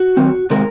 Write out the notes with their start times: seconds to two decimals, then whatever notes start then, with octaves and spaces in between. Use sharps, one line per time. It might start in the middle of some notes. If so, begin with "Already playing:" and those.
Already playing: F#4
0.17 D#3 F#3 C4
0.50 C3 D#3 G#3 C4 A#4